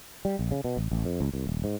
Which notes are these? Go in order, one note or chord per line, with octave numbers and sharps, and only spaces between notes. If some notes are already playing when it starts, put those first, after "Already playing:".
G3
A#1
C#3
B2
A1
A1
F2
C#2
C2
D#1
G#2